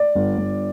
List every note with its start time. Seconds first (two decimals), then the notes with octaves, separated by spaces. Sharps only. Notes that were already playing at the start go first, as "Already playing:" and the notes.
Already playing: D5
0.15 G1
0.37 G1